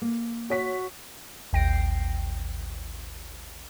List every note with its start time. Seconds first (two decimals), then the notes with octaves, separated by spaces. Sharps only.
0.02 A#3
0.50 F#4 C#5 B6
1.53 A1 D#2 G5 A#6 C7 D7